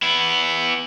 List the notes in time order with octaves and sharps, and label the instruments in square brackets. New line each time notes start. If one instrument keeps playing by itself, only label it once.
[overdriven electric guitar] B3 E4